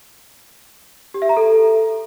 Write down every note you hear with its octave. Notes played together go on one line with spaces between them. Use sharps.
G4
E5
A#5
A4